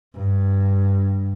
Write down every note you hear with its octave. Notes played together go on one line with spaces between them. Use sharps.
G2